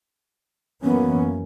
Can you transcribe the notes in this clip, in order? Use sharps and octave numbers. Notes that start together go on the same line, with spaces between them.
F#2 E3 A#3 B3 C#4